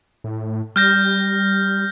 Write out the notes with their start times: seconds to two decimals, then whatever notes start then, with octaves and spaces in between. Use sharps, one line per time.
0.24 A2
0.76 G3 F6 G6 A#6